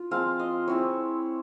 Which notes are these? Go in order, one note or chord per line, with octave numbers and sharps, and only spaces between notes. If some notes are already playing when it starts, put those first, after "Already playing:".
Already playing: F4
F3 G#3 C4 F5
D#5
G#3 C4 E4 C#5